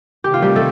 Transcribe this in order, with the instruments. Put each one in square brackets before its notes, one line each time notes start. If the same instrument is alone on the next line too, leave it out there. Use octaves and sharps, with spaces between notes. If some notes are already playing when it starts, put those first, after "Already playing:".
[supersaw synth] C3 D#3 A3 [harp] G4
[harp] F4
G3 G4
A3 A4